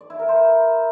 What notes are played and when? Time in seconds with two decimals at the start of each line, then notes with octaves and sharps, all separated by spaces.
0.01 D5
0.10 E4
0.19 A#4
0.29 C5